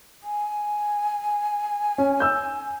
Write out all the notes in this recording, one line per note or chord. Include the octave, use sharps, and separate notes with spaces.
G#5
C#4
E6 G6